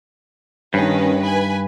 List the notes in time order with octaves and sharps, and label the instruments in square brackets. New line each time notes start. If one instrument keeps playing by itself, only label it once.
[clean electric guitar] G2 [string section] D#3 C#4 B4
[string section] B4 G#5